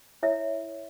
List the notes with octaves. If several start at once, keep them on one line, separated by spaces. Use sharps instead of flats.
E4 C#5 E5